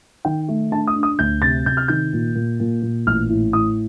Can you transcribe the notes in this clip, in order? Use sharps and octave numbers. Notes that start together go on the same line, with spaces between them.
D#3 G5
A3
D4 A5
D#6
D4
D#6
D2 G6
C3 A6
C3 G6
F6
D#3 G6
A#2
A#2
A#2
A#2
A1 F6
A2
A2 D#6